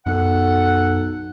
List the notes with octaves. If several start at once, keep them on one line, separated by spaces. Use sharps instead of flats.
B1 F#2 A4 F#5